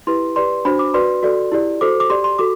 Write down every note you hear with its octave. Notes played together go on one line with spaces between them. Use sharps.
E4 G4 B4 C6
G4 B4 D5 C6
D4 F#4 C5 B5
D6
F#4 B4 D5 C6
F#4 A4 D5
E4 G4 D5
F#4 A4 C5 D6
D6
G4 D5 C6
C6
F#4 A4 D6